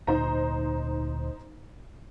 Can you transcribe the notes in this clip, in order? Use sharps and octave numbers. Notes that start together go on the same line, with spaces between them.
D2 A#2 D#4 C5 A#5